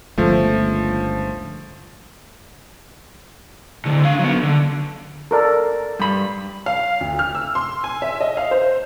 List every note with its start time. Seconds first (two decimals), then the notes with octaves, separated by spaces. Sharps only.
0.18 G1 C#2 F3 A3
3.85 A2 D3
4.05 D4 F5
4.19 F#3 B3
4.43 D3
5.31 A4 A#4 D5
5.99 G2 B5
6.66 F5
7.01 D2
7.19 F6
7.35 E6
7.55 C6
7.84 G#5
8.02 E5
8.21 D#5
8.37 F5
8.51 C5